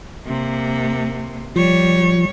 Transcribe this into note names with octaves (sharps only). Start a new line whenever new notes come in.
C3 A#3
F3 G3 C#5